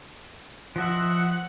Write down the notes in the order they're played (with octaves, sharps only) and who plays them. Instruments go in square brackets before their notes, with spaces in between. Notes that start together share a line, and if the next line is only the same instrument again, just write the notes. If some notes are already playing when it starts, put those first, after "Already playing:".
[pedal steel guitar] F3 D#5 E5 [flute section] F#5 F#6